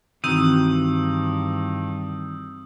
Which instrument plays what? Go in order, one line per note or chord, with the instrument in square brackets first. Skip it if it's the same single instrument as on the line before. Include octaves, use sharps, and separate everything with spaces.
[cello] G2 [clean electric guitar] D#3 E3 [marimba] C4 F#4 [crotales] D#6 E6 G6